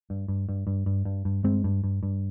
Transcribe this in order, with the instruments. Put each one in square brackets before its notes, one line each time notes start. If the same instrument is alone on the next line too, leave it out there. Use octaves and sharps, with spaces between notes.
[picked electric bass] G2
G2
G2
G2
G2
G2
G2
G2 G#3 C4
G2
G2
G2